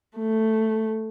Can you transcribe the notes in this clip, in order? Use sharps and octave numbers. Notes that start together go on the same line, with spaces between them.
A3